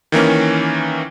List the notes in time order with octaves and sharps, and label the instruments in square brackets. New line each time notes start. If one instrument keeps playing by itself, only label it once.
[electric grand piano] D#3 E3 A#3 C#4